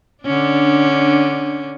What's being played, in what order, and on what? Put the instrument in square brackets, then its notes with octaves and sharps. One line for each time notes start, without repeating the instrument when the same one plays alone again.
[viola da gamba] D3 C#4 D4